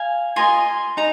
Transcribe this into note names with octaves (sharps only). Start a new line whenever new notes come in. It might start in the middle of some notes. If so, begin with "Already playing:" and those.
Already playing: F5 G#5
F4 A#4 D#5 G#5 C6
D#4 A#5